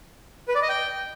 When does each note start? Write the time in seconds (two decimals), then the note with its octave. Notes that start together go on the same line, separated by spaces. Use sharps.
0.48 B4
0.55 D5
0.62 D#5
0.69 G5